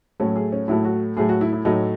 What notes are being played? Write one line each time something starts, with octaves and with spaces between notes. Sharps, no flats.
A2 F#3 A3 C#4
G#4
C#4
A2 F#3 A3 E4
F#4
A2 F#3 A3 G#4
F#4
E4
E4
A2 F#3 A3 D#4